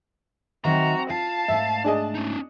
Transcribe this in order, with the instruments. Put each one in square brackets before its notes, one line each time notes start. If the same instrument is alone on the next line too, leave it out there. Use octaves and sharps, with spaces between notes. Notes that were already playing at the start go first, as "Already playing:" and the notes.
[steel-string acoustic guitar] D#3 F#3 E5 [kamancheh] C4 F#4 [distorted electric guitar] A#5
[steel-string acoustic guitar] F4 [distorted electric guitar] F5 [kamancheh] A5
[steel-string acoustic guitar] G#2 A3 [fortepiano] E5
[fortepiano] D4 G#4 D#5
[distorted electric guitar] C#4 D#4